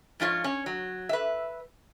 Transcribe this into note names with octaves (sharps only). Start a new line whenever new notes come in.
G#2 F3 F4 C#5
C#4
F#3
B4 E5